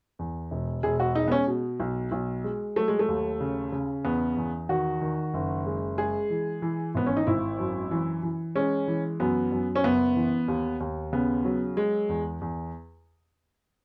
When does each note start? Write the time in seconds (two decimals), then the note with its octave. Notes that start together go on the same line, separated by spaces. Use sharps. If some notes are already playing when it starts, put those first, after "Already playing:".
0.19 E2
0.51 E1
0.83 E1 G#4
1.00 F#4
1.15 G#3 D#4
1.28 B3
1.32 C#4
1.47 B2
1.80 B1
2.12 B1
2.44 G#3
2.76 F#3 A3
2.88 G#3
2.99 A3
3.08 D#2
3.41 C#3
3.72 C#3
4.05 E2 B3
4.37 E2
4.69 D#3 F#4
5.01 D#3
5.34 F#1
5.66 G#3
5.98 G#3 G#4
6.30 E3
6.62 E3
6.94 G#1 B3
7.06 C#4
7.17 D#4
7.27 G#1 E4
7.59 F#2
7.91 E3
8.23 E3
8.55 G#3 C#4
8.88 E3
9.20 F#2 B3
9.52 F#2
9.76 C#4
9.84 F#1 B3
10.16 E3
10.48 D#2
10.80 D#2
11.13 C#3 B3
11.45 F#3
11.77 G#3
12.09 E2
12.41 E2